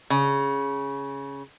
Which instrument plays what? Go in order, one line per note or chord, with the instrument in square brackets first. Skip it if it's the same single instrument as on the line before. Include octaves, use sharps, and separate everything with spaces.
[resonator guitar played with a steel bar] C#3